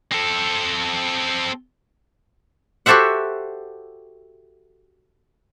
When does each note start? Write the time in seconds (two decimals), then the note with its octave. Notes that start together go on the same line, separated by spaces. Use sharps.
0.12 C4 A4
2.86 F#4 G4 A4 C5 E5 F#5